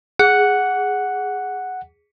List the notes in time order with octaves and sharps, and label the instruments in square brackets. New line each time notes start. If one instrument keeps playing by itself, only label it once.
[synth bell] G#4 [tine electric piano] F#5